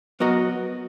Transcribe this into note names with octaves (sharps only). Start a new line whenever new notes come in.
F#3 B3 F#4 A#4 D#5